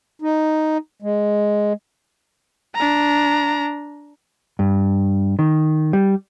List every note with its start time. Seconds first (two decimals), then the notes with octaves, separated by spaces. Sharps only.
0.22 D#4
1.02 G#3
2.75 D4 A#5
4.59 G2
5.39 D#3
5.93 G3